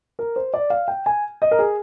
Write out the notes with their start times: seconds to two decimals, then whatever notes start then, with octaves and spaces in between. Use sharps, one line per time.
0.19 A#4
0.36 C5
0.54 D5
0.70 F5
0.88 G5
1.06 G#5
1.42 D#5
1.51 A#4
1.59 G#4